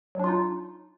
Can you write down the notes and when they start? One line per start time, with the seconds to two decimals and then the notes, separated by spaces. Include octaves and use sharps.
0.15 F#3
0.20 D4
0.24 F4
0.28 D#4